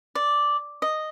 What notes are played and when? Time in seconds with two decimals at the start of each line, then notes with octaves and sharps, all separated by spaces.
0.15 D5
0.82 D#5